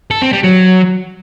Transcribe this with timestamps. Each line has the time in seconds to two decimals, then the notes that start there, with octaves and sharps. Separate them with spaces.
0.11 A4
0.22 C4
0.33 G3
0.44 F#3